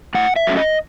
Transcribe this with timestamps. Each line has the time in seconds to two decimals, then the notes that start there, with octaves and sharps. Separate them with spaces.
0.14 A2 F#5
0.36 E5
0.47 F#3 A3 C#4
0.57 D#5